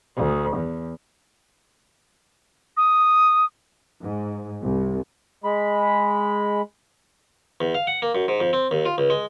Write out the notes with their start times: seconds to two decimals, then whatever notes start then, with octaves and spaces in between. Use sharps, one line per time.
0.17 D2
0.56 E2
2.77 D#6
4.04 G#2
4.63 C2
5.44 G#3 B5
7.61 E2
7.75 F5
7.87 F#5
8.02 A#3
8.15 F#2
8.28 G#2
8.40 F2
8.53 C4
8.71 D#2
8.86 F4
8.98 C#2
9.10 G#3